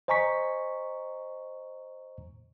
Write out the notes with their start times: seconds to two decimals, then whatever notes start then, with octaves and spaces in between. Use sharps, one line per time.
0.08 C5 D#5 G#5 A#5 C#6 B6